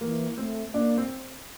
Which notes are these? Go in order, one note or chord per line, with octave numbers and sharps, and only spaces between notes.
E3 A#3 A#4
A3 C4 C5
A#3 D4 D5
C4 C5